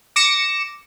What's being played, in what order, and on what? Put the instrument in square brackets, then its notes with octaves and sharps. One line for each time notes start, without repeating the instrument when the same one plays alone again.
[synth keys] D6 A#6 C#7 E7